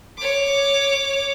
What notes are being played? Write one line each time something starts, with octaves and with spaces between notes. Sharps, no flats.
C#5 D6